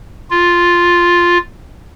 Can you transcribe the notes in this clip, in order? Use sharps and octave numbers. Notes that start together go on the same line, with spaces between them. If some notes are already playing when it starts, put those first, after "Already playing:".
F4